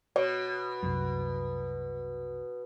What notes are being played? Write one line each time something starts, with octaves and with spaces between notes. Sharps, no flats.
B2 C#5
C2 F#2